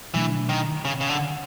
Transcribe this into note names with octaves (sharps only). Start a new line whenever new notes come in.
B2 E3 F#3 A3 D4
D#3
C#3
C#3
D3